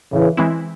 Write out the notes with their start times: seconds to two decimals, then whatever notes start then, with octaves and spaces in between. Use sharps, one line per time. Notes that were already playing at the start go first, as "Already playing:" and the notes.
0.13 A2 C#3 E3
0.37 E3 G#3 C4 E4